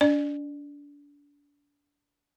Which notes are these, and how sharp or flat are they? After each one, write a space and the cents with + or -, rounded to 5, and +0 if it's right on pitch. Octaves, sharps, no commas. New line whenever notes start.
D4 -30 D5 +30